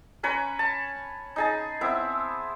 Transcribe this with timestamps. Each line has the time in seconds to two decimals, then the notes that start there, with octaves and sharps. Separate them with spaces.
0.23 C#4 B4 C#5 A#5
0.59 A5
1.36 D#4 G#4 A5
1.81 B3 C4 E4